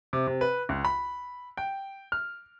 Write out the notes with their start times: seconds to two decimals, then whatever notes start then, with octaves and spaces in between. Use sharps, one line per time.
0.13 C3
0.27 C3
0.41 B4
0.69 C#2
0.85 B5
1.57 G5
2.12 F6